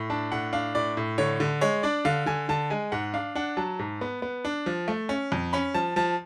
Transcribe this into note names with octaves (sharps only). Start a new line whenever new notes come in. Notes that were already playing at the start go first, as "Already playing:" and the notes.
Already playing: A2
D4 A5
A2 F#5
D4 F5
A2 D5
A2
D3 C#5
D3
G#3 C#5
D4 D5
D3 F5
D3 G#5
D3 A5
G#3 G#5
G#2 F#5
D4 F5
D4 F#5
F#3 A5
G#2
B3
B3
D4
F3
A3
C#4
F2
C#4 B5
F3 A5
F3 A5